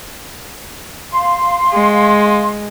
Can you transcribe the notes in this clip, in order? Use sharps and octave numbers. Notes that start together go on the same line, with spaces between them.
F5 C6
G#3